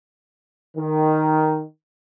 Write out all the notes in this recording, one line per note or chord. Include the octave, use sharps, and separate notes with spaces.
D#3